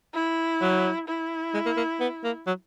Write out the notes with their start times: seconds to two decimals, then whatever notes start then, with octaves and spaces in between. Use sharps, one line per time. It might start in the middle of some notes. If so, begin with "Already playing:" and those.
0.14 E4
0.62 F#3
1.08 E4
1.54 G#3
1.66 A#3
1.77 A#3
2.00 B3
2.24 A#3
2.47 F#3